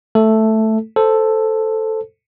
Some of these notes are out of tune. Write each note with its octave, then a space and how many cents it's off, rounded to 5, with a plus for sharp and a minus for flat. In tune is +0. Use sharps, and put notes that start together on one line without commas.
A3 +0 A4 +0
A4 +0 C5 +0